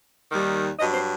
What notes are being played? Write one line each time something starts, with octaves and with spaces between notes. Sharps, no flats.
D#2 D#3 G3
G2 F#3 D#5
C5